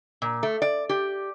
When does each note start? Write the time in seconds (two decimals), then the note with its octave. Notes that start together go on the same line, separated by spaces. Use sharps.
0.22 A#2
0.43 A3
0.62 D5
0.89 G4